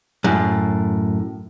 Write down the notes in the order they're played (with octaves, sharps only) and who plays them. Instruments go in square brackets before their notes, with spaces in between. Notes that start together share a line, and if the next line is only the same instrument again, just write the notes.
[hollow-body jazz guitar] F#2 A2